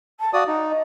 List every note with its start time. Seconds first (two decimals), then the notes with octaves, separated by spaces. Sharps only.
0.19 A5
0.33 F#4 D5 F5 D#6
0.47 D#4 F#5
0.69 D#5